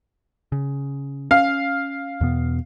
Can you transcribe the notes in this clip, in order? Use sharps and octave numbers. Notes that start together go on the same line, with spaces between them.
C#3
C#4 F5
E2 B2 B3